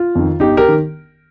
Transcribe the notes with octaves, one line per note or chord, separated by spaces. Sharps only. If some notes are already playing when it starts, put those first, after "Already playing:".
Already playing: F4
F2 D#3
G1 D#4 G4
G4 A#4
D#3